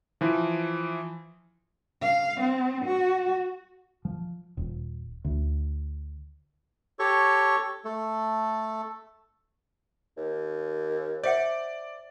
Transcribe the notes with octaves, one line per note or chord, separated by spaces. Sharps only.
E3 F3
F5
C4
F#4
F3
D#1
D2
G4 A4 C#5 C#6
A3 A4
D#2
C5 D5 E5 F#5